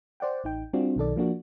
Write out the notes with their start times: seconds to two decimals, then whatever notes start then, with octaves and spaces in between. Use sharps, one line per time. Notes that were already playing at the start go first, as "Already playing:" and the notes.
0.20 C5 D5 F#5 G5
0.44 A1 D#4 G5
0.73 G3 C4 D4 F4 F#4
0.96 B1 D#3 A4 D5
1.16 F3 A#3 D4 F#4